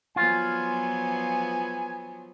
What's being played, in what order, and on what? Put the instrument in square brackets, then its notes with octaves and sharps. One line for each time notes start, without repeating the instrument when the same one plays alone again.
[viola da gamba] F3 F#3 B3 [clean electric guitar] F4 [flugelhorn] G#5